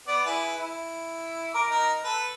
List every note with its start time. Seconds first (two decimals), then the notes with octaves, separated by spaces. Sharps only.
0.07 B3 D5
0.25 E4 G#4 B4
0.57 E4
1.54 A#4 D6
1.70 D#4 A#4
2.04 A4 B4